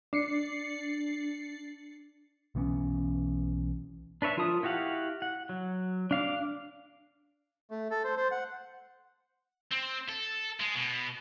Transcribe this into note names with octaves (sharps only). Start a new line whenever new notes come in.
D4 C7 C#7
B1 E3 B3 C#4
D4 B4 C#5 E5
F3 F4 A#4 A5 D#6
E4 F#4 G4 F5 F#5
F#5
F#3
D4 F5 D6
A3
A4
C5
C5
F#5
C4
A4
G#3
B2